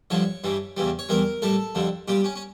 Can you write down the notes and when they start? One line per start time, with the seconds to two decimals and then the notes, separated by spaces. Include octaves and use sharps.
0.10 G2 D3 F3 C#5
0.44 G2 E3 G3
0.77 E2 C#3 E3 G3
0.99 C#5
1.09 E2 E3 G3 A#4
1.42 A2 G3 A4
1.75 F2 D3 G3
2.08 A#2 G3 G4
2.24 C#4
2.36 C#4